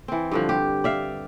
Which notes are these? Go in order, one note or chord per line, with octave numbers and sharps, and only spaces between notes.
E3 C4
G2 D3 F3
G4
D5 E5 F5